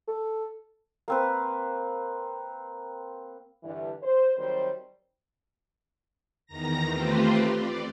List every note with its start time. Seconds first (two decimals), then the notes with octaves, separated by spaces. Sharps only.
0.08 A4
1.08 A#3 C4 B4
3.63 G2 D3 E3
4.03 C5
4.37 D#3 F#3 G3 C4 C5
6.46 E2 D#3 A#5 A#6
6.89 A3 C4 F4 G4 B4 C5
7.53 D5